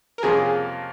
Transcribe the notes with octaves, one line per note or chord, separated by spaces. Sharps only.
A#4
F2 C3 F3 A#3 C#4 G#4